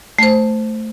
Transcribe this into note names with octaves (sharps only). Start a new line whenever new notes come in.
A3 C5